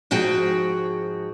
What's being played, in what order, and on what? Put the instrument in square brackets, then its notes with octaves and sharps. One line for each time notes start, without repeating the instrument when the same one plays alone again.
[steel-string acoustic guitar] G#2 F3 F#4 G#4 G5